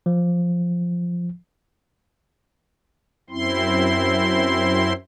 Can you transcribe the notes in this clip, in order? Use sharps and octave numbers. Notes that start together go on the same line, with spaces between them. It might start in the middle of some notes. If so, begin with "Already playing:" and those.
F3
F#2 C4 E4 C6